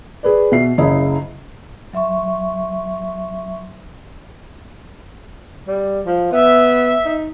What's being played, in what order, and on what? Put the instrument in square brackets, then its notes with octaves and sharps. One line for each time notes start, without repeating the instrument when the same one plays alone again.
[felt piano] G#4 B4 D5
B2 E5 C7
F#1 C#3 E4 D#5
[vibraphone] F#3 E5 C6 C#6
[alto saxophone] G3
F3
[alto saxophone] B3 [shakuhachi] E5
[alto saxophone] D#4